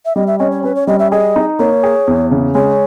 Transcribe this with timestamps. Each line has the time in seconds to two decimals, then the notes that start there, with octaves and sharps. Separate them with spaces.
0.05 E5
0.16 G3 D#5
0.27 E5
0.39 C#4 D#5
0.51 C#5
0.64 C#4 B4
0.76 C#5
0.87 G3 D#5
0.99 E5
1.12 G#4 D#5
1.36 D#4
1.59 A#3 C#5
1.83 G#4
2.07 E2
2.31 C#3
2.55 G#3 C#5